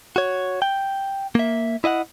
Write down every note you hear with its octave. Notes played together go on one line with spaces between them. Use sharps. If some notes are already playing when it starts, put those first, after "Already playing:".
F#4 C#5
G5
A#3 E5
E4 D#5 F5 F#5